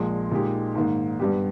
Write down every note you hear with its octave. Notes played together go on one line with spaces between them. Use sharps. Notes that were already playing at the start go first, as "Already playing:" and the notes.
Already playing: A#1 A#2 G#3
A#2 G#3 D#4 G4
G#2 D#3 A#3
G2 G3 B3 G4